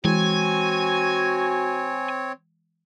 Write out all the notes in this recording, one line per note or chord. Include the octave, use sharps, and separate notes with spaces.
E3 G#3 C4 F#4 C#5 G#5